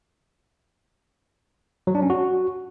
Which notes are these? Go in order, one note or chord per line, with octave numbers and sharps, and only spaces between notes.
F#3
D4
C#4
F#4